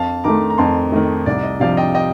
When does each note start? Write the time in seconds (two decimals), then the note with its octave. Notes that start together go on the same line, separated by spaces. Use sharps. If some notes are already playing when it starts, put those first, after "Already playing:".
Already playing: F2 F5 A5
0.24 D#3 A3 A#5 D6
0.50 A#5
0.58 F2 A5 C6
0.92 D#3 A3 D#5
1.26 C2 D5
1.43 D#5
1.60 C3 F3 D5 F5
1.77 D#5 G5
1.95 D#5 G5